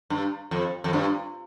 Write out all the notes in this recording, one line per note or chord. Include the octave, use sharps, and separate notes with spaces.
G2
F2
F2
G2